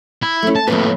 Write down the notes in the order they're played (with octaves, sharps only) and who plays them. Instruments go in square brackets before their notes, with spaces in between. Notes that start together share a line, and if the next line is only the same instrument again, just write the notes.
[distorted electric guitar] E4
[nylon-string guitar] A3 C#4
[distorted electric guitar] A5
[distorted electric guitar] F2 A2 [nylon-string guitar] A3 A#3 B4